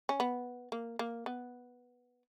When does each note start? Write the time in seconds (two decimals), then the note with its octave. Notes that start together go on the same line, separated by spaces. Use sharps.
0.09 C#4
0.20 B3
0.72 A#3
0.99 A#3
1.26 B3